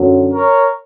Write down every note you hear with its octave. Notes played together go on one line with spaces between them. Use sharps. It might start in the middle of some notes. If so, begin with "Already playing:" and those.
Already playing: F#2 D3 F#3 C#4
A#4 C#5